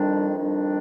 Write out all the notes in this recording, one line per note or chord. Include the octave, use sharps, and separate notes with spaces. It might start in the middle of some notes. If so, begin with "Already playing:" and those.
Already playing: F2 D#3 G3 D4
F2 D#3 G3 D4